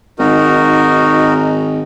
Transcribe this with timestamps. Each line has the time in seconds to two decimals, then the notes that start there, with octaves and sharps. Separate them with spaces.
0.19 G#1 D#4 F#4 A#4